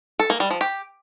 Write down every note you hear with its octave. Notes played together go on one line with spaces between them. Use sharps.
A4
A#3
G3
F3
G4